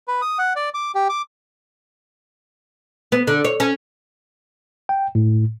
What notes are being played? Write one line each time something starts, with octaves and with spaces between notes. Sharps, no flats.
B4
D#6
F#5
D5
D6
G4
D6
B3
D3
C#5
C#4
G5
A2